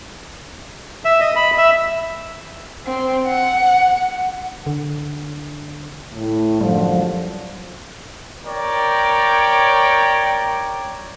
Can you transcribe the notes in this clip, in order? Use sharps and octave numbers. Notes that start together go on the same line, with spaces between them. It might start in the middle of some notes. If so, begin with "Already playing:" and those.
E5
D#5
B5
E5
C4
F#5
D3
A2
F#2 D3 F3 G3
A#4 C#5 D5 G5